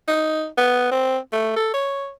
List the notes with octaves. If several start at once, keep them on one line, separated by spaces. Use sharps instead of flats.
D#4
B3
C4
A3
A4
C#5